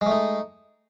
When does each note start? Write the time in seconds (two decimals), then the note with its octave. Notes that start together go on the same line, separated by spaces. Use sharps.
0.01 G#3
0.06 A3
0.11 D#4